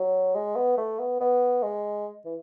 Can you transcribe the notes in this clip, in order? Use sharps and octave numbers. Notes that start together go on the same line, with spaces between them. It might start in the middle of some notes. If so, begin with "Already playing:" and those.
Already playing: F#3
G#3
B3
A3
B3
B3
G#3
E3